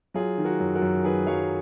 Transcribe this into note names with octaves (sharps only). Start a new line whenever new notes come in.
F#3 F4 G#4
D#3
F#4 A#4
F#2
F#4 A#4
F#2
D#3 G#4 B4
F#3 C#5 F5